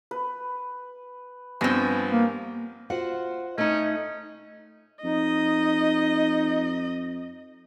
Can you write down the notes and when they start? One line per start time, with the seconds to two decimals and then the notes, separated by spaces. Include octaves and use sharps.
0.11 B4
1.61 G2 F3 B3 C4 G#5 A#6
2.11 A#3
2.90 F4 F#4 C5 F#5
3.58 A3 C#4 D#4 D#5
5.03 F2 D#4 D#5